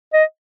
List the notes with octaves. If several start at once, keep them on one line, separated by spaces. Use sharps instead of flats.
D#5